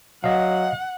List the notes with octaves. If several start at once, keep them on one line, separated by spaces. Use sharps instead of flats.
F#3 D#5 F5 F#5